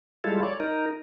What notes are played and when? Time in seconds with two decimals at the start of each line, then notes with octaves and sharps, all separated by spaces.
0.24 G3 G#3 E4 F4 A4
0.43 C#5 D5
0.60 D#4 A#4